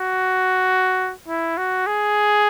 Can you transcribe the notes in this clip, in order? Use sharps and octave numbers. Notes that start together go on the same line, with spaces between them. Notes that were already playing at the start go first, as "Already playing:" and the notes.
Already playing: F#4
E4
F#4
G#4